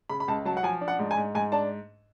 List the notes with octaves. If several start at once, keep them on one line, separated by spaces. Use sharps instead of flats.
C#3 B5
B5
C#2 A5
F#3 A5
F#5
F3 G#5
D4
F#5
G#2
G#5
G#2
G#2 G#5
D4 A5